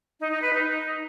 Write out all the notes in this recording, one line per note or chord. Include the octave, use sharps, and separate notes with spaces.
D#4
D#4
B4
D#4